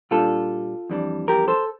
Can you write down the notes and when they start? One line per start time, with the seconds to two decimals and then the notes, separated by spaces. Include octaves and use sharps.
0.11 A#2 G3 D4 F4 A4
0.90 F2 E3 G3 D4
1.28 G4 A#4
1.48 A4 C5